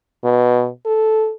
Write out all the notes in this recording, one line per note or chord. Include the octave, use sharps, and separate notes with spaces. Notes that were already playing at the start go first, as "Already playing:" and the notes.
B2
A4